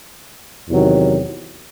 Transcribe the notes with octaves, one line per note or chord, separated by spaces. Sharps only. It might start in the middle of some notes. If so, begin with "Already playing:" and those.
E2 C3 D#3 F#3